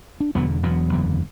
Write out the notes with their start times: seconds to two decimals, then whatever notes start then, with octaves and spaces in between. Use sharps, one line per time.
0.20 D4
0.35 E1 E2 D3 F#3 B3
0.63 E1 E2 B2 F#3 B3
0.92 F#1 E2 D3